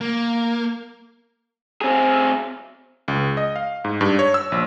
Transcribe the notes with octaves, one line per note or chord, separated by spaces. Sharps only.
A#3
C4 G#4
C#2
D#5
F5
G#2
G2
C#5
E6
A#1